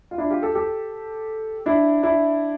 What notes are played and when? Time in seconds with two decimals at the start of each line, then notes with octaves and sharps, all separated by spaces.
0.11 F4
0.18 D4 E4
0.30 F4 G4
0.42 G4 A4
0.55 G4 A4
1.66 D4 E4
2.03 D4 E4